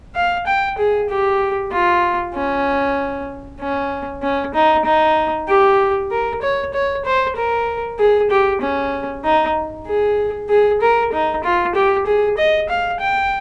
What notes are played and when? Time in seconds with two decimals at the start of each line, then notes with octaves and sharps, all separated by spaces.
0.16 F5
0.47 G5
0.78 G#4
1.10 G4
1.73 F4
2.35 C#4
3.61 C#4
4.23 C#4
4.55 D#4
4.86 D#4
5.49 G4
6.11 A#4
6.42 C#5
6.74 C#5
7.05 C5
7.37 A#4
7.99 G#4
8.31 G4
8.62 C#4
9.25 D#4
9.87 G#4
10.50 G#4
10.81 A#4
11.13 D#4
11.44 F4
11.75 G4
12.07 G#4
12.38 D#5
12.69 F5
13.01 G5